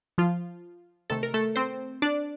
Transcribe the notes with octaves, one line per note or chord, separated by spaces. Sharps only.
F3 F4
C3 D#3 A3 A4
A#4
A3 A4
C4 C5
D4 D5